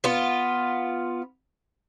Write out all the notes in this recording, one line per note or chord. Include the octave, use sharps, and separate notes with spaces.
B3 F4